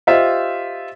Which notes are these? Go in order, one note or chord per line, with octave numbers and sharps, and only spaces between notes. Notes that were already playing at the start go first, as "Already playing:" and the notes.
F4 G4 C5 D#5 E5